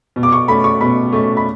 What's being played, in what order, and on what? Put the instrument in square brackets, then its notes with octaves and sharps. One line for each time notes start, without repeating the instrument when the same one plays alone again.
[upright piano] B2
D6
C#6
A3 C#4 B5
C#6
B2 B5
A3 C#4
B5